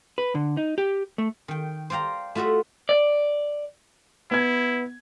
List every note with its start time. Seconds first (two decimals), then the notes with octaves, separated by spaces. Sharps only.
0.18 B4
0.35 D3
0.57 D#4
0.78 G4
1.18 A3
1.48 D#3 G5
1.90 C5 D5 F5 G5 A#5
2.35 A3 F4 F#4 D#5 E5
2.89 D5
4.31 B3 E4 G#6